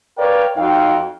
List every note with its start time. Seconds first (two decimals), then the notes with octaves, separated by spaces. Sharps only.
0.18 A#4 B4 C#5 D5 F5 G5
0.57 F2 D#4 F#4 F5 G5